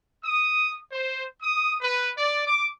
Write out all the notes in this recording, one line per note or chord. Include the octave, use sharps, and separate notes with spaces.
D#6
C5
D#6
B4
D5
D6